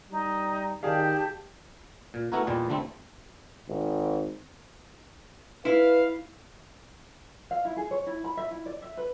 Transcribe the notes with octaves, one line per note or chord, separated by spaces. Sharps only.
G3 D#4
D#3 G4 G#4 D5 F5 A5
A#2
A3 B3 E4 F#4 A#4
E2 A#2 G3 G#3
D3 G3 A3 C4
G#1
E4 B4 F5
F5
E4
G#4
C#5
E4
B5
E5
E4
D5
E5
B4